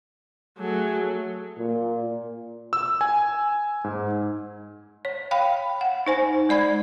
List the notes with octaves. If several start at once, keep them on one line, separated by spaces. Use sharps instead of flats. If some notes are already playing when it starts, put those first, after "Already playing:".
F#3 A3 G#4 A4
A#2
E6
G#5
G#2
C#5
F5 G5 B5
F#5
D#4 C5 G#5
G#3 D5 B5 G#6